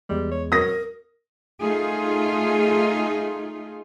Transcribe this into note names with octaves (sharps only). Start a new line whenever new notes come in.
E2 G3 G#3
C#5
F#3 A#4 D#6 A#6
A3 D#4 F4 G#4